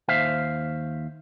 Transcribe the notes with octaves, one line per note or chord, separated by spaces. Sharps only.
D#2 C5 E5 F5